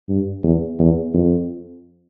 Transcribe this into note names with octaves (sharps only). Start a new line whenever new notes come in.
G2
E2
E2
F2